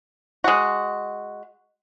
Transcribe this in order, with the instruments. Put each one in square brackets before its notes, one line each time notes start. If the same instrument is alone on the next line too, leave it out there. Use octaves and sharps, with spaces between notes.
[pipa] G#3 F#4